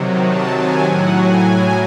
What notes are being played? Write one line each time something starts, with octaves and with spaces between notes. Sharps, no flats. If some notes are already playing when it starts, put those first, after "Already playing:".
Already playing: C3 D#3 F#3
A5
G#5
A2 F#3 F#5
G#5
G#5